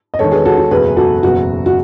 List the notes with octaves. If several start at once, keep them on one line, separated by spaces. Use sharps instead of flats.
D#5
E1 E2 D#3 A4 C#5
G#4 B4
F#4 A4
F#4
F#1 E2 B2 G#4 B4
F#4 A4
F#1 E2 B2 F#4
F#4